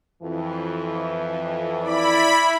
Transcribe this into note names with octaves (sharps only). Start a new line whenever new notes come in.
F2 E3
E4 D5 B5